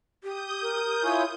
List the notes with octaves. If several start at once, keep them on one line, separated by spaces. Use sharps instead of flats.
G4 D#6 G6
A#4
E4 F4 C#5 G#5